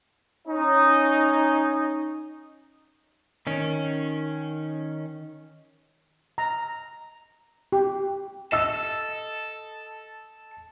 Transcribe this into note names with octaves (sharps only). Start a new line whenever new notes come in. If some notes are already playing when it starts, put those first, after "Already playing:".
C#4 D#4
D#3 C#4
A#5
G4
A4 D#5 E6